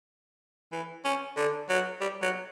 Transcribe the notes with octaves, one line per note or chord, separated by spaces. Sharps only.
E3
C#4
D3
F#3
G3
F#3